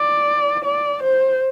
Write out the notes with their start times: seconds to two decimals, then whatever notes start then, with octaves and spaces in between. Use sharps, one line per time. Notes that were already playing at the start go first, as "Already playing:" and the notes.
Already playing: D5
0.65 D5
1.03 C5